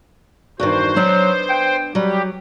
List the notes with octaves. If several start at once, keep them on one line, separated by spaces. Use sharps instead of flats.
E2 G2 D#3 F#4 C5
F#3 B3 D4
G5
F#3 G3 G4